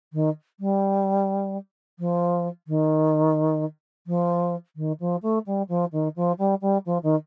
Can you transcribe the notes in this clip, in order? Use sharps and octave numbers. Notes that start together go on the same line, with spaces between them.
D#3
G3
F3
D#3
F3
D#3
F3
A3
G3
F3
D#3
F3
G3
G3
F3
D#3